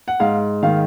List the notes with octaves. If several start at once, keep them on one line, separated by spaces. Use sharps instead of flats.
F#5
G#2 F5
D#3 F5